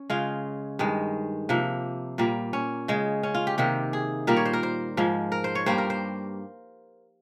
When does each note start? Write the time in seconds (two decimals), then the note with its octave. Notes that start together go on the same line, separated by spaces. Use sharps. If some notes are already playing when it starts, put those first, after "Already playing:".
Already playing: C#4
0.10 C#3 G#3 F4
0.79 G2 D#3 G#3
1.49 C3 F3 A#3
2.18 A#2 G3 A#3
2.53 C#4
2.88 C#3 G#3
3.23 C#4
3.34 F4
3.47 G4
3.58 C3 D#3 A#3 G4
3.93 G#4
4.27 A#2 G3 A#3 A#4
4.37 C#5
4.45 C5
4.53 A#4
4.63 C5
4.97 G#2 F3 G#3
5.32 A#4
5.44 C5
5.55 C#5
5.66 G2 G3 A#3 C5
5.78 A#4
5.90 C5